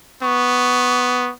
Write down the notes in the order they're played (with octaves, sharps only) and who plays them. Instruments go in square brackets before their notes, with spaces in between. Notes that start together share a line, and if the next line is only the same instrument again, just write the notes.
[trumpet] B3 [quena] C#6